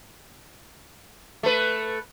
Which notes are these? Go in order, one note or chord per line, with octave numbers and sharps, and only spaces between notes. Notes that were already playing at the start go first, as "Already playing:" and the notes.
A3 B4